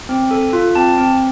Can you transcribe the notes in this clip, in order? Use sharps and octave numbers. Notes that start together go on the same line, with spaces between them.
C4
A4
F4
C4 A5
C4